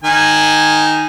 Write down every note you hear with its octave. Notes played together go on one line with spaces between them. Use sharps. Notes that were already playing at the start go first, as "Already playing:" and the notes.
D#3 G#5